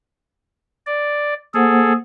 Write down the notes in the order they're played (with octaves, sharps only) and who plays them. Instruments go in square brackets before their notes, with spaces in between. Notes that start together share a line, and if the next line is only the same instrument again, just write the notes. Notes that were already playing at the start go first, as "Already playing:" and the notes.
[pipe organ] D5
[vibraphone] A#3 C5 F#5 [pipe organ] G#4 A4